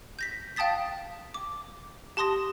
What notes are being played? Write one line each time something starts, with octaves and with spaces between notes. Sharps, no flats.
G6 A#6 B6
F5 G5 A5 D#6 A6 B6
D6
G4 A5 C6 D#6 A#6